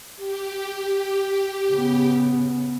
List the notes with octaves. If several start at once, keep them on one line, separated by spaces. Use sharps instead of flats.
G4
C#3 B3